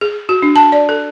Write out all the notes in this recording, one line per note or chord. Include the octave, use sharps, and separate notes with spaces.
G#4
F#4
D4
A5
D5
A4